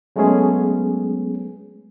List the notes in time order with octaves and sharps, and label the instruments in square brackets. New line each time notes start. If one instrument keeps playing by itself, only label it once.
[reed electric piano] F#3 G#3 A3 B3 C#4 G#4